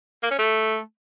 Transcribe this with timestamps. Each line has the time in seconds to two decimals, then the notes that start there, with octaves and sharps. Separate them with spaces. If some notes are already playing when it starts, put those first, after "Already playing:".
0.23 A#3
0.31 C#4
0.39 A3